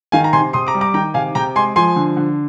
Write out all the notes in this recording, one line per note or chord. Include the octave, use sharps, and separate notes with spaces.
D#3 F5 G#5
A#5
C3 G#5 C6
C3 C6 D#6
A#5 D6
G3
A#5 D6
D#3 G5 A#5
C3 F5 G#5
C3 G5 A#5
G#3 G#5 C6
F3 G#5 C6
D3
D3